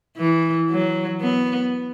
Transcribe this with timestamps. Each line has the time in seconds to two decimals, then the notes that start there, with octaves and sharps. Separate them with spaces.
0.17 E3
0.70 F#3
1.21 B3